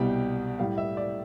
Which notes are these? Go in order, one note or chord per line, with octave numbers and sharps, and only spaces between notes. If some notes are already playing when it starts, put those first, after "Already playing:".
Already playing: C2 B2 G3 G5
A2 G3 F5
E5
D5